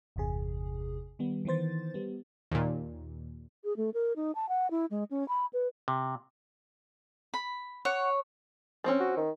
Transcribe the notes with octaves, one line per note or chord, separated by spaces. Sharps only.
G1 E2 C3 G#4
D#3 G3 B3
D#3 E3 B3 C5 A6
G3 B3
D#2 A#2
G#4
A3
A#4
D#4
A5
F#5
E4
G#3
C#4
B5
B4
C3
B5
C#5 F#5
F3 C4 C#4
F#4
D#3